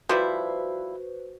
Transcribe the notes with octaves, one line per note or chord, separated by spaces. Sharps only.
F3 G3 E4 F#4 B4 C5